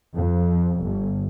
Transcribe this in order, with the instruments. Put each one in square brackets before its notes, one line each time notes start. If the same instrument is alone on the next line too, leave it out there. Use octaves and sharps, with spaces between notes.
[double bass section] F2
G1